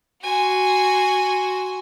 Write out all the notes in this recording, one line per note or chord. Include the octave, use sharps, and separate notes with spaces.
F#4 G#5 C6